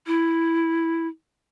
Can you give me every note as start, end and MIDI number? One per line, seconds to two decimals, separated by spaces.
0.07 1.07 64